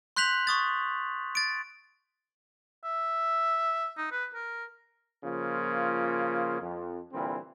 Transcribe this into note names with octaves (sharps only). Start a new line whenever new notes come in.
C6 F#6 G6 B6 F7 F#7
C#6 D#6 A6
A6 D7
E5
D#4
B4
A#4
C#3 F3 A#3 F4
F2
A#2 D3 E3 G3 C4